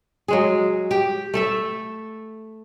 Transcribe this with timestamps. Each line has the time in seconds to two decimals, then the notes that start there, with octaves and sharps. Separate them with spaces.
0.28 F#3 G#3 G#4
0.91 G4
1.34 A3 A4 E5